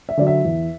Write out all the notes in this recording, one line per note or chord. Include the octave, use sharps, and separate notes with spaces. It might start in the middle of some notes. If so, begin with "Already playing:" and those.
E5
D3 F#3 D5
E5
E2